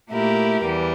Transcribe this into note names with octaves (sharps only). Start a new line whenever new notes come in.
A#2 A3 E4 G4 A#4
E2 E3 G3